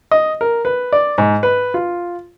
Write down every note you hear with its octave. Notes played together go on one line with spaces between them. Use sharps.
D#5
A#4
B4
D5
G#2
B4
F4